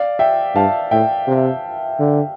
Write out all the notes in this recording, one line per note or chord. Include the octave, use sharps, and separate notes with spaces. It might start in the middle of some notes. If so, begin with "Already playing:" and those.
Already playing: D5 F5
E5 G5
G2 F5 A5
A2 E5 G5
C3
D3